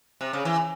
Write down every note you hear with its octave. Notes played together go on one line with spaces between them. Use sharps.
C3
C#3
E3